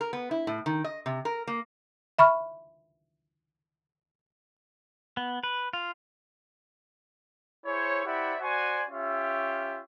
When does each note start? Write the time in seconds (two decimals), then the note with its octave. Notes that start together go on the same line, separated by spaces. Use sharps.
0.01 A#4
0.13 B3
0.31 E4
0.47 A2
0.66 D#3
0.84 D#5
1.06 C3
1.25 A#4
1.47 A#3
2.19 E5 B5 C#6 F6
5.17 B3
5.43 B4
5.73 F4
7.66 E4 G#4 C5 C#5
8.04 E4 G4 C5 D5 E5 F#5
8.41 F#4 C5 D5 F#5 G#5
8.89 C#4 F4 G4 E5